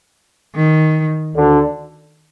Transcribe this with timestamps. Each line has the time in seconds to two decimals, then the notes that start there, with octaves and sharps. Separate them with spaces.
0.56 D#3
1.36 D2 D3